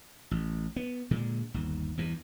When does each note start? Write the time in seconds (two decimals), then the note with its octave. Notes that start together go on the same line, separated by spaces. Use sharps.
0.31 A1
0.76 B3
1.11 A#2 D3 G#3
1.54 G1 D#2
1.98 E2 G2 E3